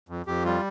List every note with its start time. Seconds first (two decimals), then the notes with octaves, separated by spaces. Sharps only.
0.09 F2
0.26 F2 G4
0.45 G3 F4